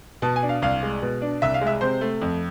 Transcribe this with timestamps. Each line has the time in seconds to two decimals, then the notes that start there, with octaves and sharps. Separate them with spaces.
0.22 B2 A5
0.36 G#5
0.43 D4
0.49 F5
0.62 C2 F5
0.83 G#3
1.02 B2
1.22 D4
1.42 C2 E5
1.54 F5
1.61 G#3
1.67 E5
1.81 C3 C5
2.01 A3
2.22 F2